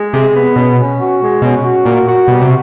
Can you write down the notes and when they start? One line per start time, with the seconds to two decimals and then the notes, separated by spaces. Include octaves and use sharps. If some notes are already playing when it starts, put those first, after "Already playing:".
Already playing: G#3
0.13 C3 G#4
0.35 B3
0.56 B2 C#4
0.78 C#4
1.00 F#4
1.20 G#3
1.42 B2 C#4
1.63 F#4
1.85 A#2 A#4
2.07 F#4
2.28 B2 G3
2.41 C3